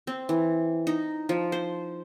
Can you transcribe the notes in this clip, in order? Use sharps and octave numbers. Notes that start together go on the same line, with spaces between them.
C4
E3
D#4
F3
C5